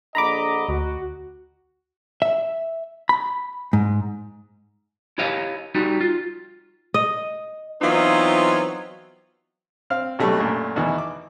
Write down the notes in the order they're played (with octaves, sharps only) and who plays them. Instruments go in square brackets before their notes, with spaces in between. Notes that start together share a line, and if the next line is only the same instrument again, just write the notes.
[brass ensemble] A#1 D3 D#5 [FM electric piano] A#5 B5 D6
[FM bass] D2 [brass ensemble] F#4
[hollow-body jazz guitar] E5
B5
G#2
[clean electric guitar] E4 G4 C#5 D#5 F5
G3 D#4 F#4
F4
[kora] D#5
[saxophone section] E3 F#3 B3 C4 D#4 F4
[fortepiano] C4 F5 F6
B1 B2 F#3 G3 A3
F#2 A#2 A3
E2 B2 D#3 E3
D6